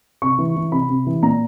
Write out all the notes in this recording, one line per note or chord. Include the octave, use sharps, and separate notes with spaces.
C3 C#6
E3
E3
C3 B5
C3
E3
A#2 A#5